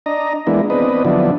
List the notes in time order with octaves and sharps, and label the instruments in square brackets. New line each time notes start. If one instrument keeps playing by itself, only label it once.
[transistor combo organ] D4 D#5 A#5
E3 G#3 A#3 B3 D4 E4
B3 C4 D4 B4 D#5
D3 F3 F#3 B3 D4 E4